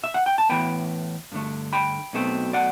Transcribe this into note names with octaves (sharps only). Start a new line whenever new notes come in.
E5
F#5
G5
A5
A2 E3 B3 G5 B5
G2 D3 A3
G5 B5
B1 B2 A3 C4
D5 F#5